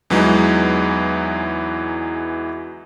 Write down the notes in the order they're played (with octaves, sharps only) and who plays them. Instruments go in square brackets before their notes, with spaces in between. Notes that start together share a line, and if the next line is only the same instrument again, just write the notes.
[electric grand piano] E2 E3 F#3 G#3 D#4